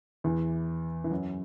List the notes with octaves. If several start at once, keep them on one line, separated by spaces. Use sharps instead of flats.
E2 E3
E3
F#2 F#3